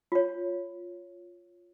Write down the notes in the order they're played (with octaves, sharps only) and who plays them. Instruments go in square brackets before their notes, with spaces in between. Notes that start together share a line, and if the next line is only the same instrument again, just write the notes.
[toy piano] F4 C#5